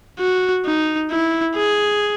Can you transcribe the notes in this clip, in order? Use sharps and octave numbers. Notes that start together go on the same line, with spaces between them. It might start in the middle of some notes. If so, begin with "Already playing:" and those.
F#4
D#4
E4
G#4